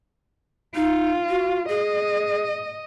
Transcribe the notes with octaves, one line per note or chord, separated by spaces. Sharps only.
D#4 F4
F#4
G#4 D#5